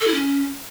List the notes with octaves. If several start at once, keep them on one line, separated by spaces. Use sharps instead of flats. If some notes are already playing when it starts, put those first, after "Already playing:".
A4
E4
C#4